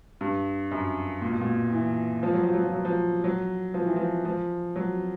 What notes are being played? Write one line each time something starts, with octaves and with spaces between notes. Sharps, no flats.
G2
F#2
A#2
B2
A#2
E3
F3
F#3
F3
F#3
F3
F#3
F3
F#3
F3
E3
F3
F3
F#3